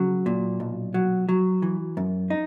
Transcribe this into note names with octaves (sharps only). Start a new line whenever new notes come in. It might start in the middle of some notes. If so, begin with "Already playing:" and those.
Already playing: C#3 F#3
A#2
B1
F#3
F#3
E3
F#2
D#4